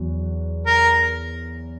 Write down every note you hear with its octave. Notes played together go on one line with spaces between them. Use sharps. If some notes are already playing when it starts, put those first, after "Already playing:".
Already playing: E2 F#3
A#4